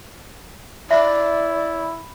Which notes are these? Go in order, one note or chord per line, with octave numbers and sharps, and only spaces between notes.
E4 D5 E5 B5